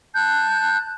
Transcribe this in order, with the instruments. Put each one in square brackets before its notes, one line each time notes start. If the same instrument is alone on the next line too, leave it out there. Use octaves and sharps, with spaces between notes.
[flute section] A5 F#6 G6